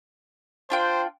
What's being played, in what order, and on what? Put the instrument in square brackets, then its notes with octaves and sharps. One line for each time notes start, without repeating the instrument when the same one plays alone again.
[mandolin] D4 F4 G5 [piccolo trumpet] C5